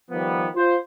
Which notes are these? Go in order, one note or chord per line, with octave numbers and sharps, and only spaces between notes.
D#3 F3 G3 B3
F4 C5